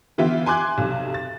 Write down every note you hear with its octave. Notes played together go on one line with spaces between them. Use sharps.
D3 E3 B3 F4 E5 G5
G#5 C6 D6 F#6 G#6
B1 C3
A6